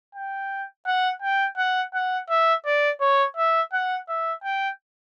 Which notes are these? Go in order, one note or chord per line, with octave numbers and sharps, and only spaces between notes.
G5
F#5
G5
F#5
F#5
E5
D5
C#5
E5
F#5
E5
G5